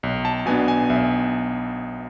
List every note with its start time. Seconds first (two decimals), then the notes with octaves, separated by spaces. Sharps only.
0.03 B1
0.25 A5
0.46 B2 B3 D4 G#5
0.68 G#5
0.90 B1 E5